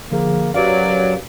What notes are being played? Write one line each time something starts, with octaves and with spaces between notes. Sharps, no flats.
D3 F3 A#3 G#4
F#2 F#3 G4 B4 D5 F5